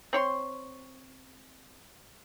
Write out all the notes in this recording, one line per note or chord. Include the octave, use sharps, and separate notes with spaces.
C4 C#5 C6